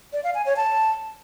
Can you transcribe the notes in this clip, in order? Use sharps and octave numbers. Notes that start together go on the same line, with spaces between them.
D5
F5
G#5
C#5
A5